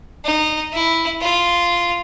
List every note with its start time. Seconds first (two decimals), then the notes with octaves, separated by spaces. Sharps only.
0.25 D#4
0.73 E4
1.22 F4